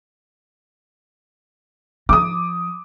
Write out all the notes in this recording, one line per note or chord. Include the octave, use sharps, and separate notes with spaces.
F3 D6 D#6